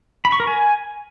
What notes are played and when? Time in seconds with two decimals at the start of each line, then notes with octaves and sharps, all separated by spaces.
0.25 B5
0.32 C#6
0.40 A#4
0.47 G#5